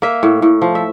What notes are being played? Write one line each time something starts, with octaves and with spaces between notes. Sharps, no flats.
A#3 E5
A2
A2
F3
E5